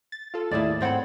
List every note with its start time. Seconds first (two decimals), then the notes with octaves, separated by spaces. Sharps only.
0.12 A6
0.34 F4 A4
0.51 D#2 A2 E4 G#4 D5
0.81 G#2 C4 C#5 F#5 B5